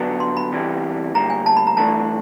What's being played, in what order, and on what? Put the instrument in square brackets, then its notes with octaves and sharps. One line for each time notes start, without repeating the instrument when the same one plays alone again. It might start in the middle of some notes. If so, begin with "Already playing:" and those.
Already playing: [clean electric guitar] D3 F#3 B3 D4
[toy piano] C6
B5
[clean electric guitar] E2 C3 E3 G3
[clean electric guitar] D2 D3 G3 A#3 [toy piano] A#5
[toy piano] G#5
A5
B5
A#5
[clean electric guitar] G2 E3 A3 D4 [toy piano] A5